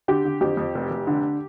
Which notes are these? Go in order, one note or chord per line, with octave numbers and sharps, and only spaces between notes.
D3 G4
D3
F2 G4
F2
F1
F1
D3